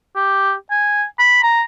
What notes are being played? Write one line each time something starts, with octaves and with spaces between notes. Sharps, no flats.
G4
G#5
B5
A#5